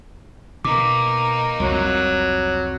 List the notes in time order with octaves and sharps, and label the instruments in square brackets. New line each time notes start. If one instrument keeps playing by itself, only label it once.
[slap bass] B2 [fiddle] A#3 D#4 [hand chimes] D6
[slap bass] C2 F2 [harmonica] F#3